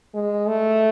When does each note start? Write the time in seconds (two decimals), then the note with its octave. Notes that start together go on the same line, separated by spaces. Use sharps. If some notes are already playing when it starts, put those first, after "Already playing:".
0.14 G#3
0.48 A3